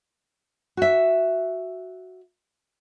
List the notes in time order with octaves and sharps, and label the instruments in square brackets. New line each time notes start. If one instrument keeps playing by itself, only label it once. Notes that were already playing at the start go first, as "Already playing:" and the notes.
[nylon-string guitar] F#4 E5